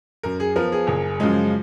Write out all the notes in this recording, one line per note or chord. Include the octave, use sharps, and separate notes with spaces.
F#2 A#4
G#4
F3 B3 A#4
G#4
F#1
F#2 C#3 F3 G#3